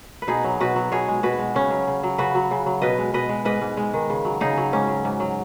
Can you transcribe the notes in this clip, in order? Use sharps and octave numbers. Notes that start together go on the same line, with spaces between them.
B4
B2 D#4 G#4
F#3
B2 F#4 B4
F#3
B2 G#4 C#5
G#3
B2 F#4 B4
G#3
C#3 C#4
F#3
C#3
F#3
C#3 F#4 B4
F#3
C#3
F#3
B2 B4 D#5
G#3
B2 B4 D#5
G#3
G#2 B4 D#5
G#2
G#3
D#3
C#3
F#3
C#3 D#4 G#4
F#3
G#2 C#4
F#3
G#2
F#3